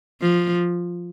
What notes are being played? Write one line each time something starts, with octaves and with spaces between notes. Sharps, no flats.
F3